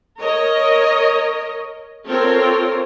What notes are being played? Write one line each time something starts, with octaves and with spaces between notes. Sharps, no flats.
A#4 C#5 D#5
C4 F4 A4 A#4 C#5